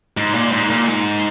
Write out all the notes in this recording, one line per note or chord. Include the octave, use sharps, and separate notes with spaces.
G#2
A#2
G#2
A#2
G#2